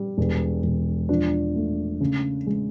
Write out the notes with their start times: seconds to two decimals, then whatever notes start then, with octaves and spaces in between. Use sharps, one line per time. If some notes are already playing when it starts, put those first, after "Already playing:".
Already playing: G3
0.18 E1
0.64 E1
1.09 F3 D4
1.56 A3
2.01 C#3
2.47 G#3